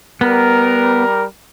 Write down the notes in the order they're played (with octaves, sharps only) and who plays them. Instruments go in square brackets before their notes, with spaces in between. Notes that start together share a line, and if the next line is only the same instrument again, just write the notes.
[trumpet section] G3 A#4 [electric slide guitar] B3